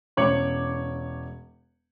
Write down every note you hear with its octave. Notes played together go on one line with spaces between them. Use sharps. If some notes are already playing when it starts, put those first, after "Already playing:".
E1 C#4 C#5 D6 C#7 F#7